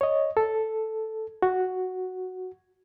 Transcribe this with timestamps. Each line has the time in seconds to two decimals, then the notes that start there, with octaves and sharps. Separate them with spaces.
0.01 C#5 D#5
0.37 A4
1.42 F#4